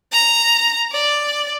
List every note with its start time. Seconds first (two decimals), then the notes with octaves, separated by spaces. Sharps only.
0.13 A#5
0.92 D5